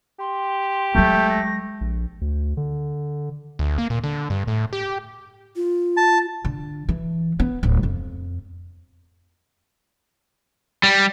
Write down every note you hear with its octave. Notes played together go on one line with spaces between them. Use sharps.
G4 C6
F#3 G#3 A3 G6
A#6
A#1
D2
D3
D2
A#3
A#2
D3
G2
A2
G4
F4
A5
D3
E3
B3
D1
F2
G3